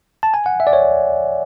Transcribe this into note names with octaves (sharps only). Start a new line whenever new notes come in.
A5
G#5
F#5
E5
D5
C#5